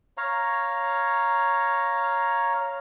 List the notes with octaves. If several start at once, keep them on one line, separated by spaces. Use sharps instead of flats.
C#5 F5 A#5